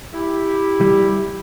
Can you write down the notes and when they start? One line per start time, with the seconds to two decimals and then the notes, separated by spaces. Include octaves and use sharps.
0.13 E4 G4
0.81 G3